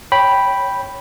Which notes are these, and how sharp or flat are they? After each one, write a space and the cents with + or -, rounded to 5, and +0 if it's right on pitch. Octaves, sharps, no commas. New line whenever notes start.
C#5 +0 G5 +0 B5 -5